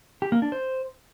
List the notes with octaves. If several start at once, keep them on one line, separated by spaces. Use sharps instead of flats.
G4
A#3
D4
C5